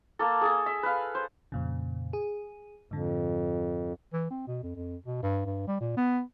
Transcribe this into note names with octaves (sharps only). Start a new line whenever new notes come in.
A#3 A4
G#4 A4
E5
B4 F5
C5
F2 A#2 C#3
G#4
F2 G#2 D3
E3
C4
B2
F2
F2
B2
G2
G2
G3
A#2
B3